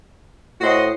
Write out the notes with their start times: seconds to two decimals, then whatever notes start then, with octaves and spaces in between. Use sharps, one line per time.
0.61 A2 F#4 C5 D#5